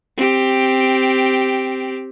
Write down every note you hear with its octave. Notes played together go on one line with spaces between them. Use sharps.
C4 G4